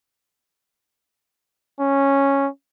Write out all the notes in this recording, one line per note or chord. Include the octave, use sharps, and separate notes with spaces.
C#4